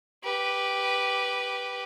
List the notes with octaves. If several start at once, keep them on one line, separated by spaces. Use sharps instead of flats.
G4 B4